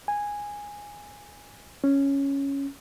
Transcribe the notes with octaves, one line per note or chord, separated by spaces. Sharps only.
G#5
C#4